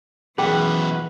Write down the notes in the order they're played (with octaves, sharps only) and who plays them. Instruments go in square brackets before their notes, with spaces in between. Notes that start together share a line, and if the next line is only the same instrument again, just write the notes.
[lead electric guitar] F#2 B2 [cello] E3 [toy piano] G#4 G5 [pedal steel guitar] B4